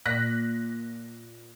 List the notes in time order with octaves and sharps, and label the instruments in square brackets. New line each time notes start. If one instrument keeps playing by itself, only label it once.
[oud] A#2 [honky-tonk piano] F#6 A#6 B6